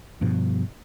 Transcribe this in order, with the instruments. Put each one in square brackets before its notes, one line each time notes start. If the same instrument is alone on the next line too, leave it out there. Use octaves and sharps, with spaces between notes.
[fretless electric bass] G2 B2 F3